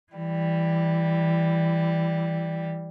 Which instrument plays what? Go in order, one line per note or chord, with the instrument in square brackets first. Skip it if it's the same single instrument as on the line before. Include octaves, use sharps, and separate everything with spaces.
[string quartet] E3 G3